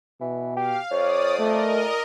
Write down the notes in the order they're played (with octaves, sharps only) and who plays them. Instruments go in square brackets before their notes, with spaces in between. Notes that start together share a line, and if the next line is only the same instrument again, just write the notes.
[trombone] B2 [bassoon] E3
[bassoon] G4 [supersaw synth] F5
[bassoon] F2 [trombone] C#5 [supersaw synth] D5 D#6
[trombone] A3 [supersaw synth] A#4 D#5
[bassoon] A#2